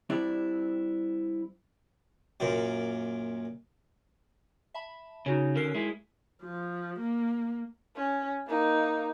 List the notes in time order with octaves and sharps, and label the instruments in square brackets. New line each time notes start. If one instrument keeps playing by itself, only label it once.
[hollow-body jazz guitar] G3 C4 D4 E4
[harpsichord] F#2 A#2
[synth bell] E5 A5 B5
[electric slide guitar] C#3 [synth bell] D#4 F#4 C#5
[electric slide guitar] D3 C#4 [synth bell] A#4 C7
[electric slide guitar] G#3 E4
[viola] F3
A#3
[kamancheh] C#4
A#3 D#4